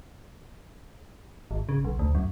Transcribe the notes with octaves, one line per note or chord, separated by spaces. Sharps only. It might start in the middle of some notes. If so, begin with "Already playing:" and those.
G#1
C#3
B1
D2
F#2